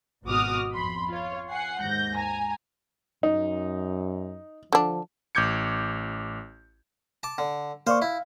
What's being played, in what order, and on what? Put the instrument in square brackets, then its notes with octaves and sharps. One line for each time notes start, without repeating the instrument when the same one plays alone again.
[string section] G#1 B2 F#4 D6 D#6 F6
F2 B5 C6
F4 C#5
F#5 G#5 C7
D#2 G#2 G6 A#6
G#5 A#5
[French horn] F#2 [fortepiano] D#4
[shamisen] D3 D4 [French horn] F3
[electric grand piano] A1 D6 G6 G#6 C#7
[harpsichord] A5 D6
D3
[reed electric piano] A#3 D5 C#6 [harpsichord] C5 F5
[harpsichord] E4 [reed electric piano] F5